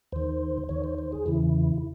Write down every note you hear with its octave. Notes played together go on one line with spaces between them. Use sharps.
D#2 D#3 C5
D#2 D#3 C#5
C5
C5
G#4
E2 C#3 E3 E4